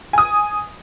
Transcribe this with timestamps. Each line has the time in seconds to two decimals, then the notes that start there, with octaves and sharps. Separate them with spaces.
0.13 G#5 D#6